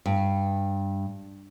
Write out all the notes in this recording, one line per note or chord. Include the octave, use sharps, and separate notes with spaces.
G2